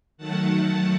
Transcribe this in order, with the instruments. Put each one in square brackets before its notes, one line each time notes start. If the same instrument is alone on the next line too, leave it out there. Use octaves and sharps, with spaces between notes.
[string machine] D#3 F#3 A3 F#5 A5